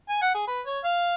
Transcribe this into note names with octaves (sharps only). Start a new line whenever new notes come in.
G#5
F#5
G#4
B4
C#5
F5